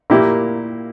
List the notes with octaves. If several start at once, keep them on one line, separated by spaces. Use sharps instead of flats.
A#2 A#3 E4 G4